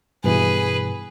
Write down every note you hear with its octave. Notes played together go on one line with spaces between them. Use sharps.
G2 B2 E3 G#4 B4